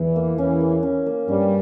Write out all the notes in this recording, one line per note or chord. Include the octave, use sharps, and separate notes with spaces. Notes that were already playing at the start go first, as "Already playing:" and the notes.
Already playing: E2 E3
A#3
E2 E3 C#4
A#3
C#4
A#3
G2 G3 C#4